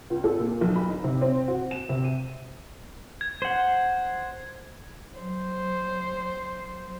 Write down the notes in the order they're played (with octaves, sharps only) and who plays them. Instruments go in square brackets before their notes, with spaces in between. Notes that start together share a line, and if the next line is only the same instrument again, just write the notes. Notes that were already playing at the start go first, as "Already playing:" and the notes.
[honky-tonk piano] C#2
A4
A#2
B1
B5
D#4
C3
C4
F#4
E7
C3
D#7
[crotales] G#6
[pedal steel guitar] C5 F#5
[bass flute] F#3 [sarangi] C5